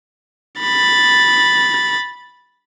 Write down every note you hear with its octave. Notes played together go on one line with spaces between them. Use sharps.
B5 A6